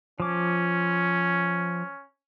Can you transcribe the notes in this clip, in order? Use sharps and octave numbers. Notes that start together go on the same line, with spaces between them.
F3 C#4 D6